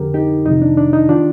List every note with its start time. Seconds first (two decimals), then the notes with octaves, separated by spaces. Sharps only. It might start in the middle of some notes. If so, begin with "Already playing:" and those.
Already playing: F2 D3 G4 A#4
0.14 D#4 G4
0.45 F2 C3 D#3 D#4
0.62 D4
0.77 D4
0.93 D#4
1.09 D#3 D4 F4